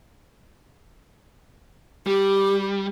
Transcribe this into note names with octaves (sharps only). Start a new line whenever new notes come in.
G3 G4